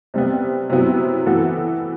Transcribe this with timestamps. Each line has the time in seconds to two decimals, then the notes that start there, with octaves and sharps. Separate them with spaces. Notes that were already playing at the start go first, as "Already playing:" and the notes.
0.14 C3 G3 B3
0.69 C3 F#3 B3 E4
1.26 E3 B3 F#4 A4